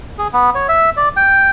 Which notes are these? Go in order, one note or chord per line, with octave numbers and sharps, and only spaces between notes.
G#4
B3
C#5
E5
D5
G5